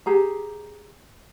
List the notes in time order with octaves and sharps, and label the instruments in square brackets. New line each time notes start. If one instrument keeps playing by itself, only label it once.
[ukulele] G4 G#4 A#5